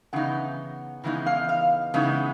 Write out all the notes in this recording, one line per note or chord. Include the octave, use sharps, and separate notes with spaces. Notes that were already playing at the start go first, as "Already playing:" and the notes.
C#3 E3 B3 D#4 F#5
C#3 E3 G#3 B3 D#4
F5
F5
C#3 E3 G#3 B3 D#4